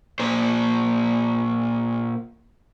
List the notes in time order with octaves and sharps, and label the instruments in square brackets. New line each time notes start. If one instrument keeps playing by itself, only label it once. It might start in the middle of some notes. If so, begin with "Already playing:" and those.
[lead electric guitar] A#2 C5